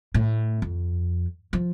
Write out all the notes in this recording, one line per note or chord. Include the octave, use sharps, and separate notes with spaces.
A2
F2
F3